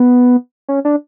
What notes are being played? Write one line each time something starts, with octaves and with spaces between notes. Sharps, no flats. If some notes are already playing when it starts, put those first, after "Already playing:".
Already playing: B3
C#4
D4